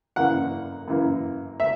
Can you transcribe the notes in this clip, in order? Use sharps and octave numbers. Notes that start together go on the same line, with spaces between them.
F#2 E3 A#3 F#5
F#2 E3 A#3
E5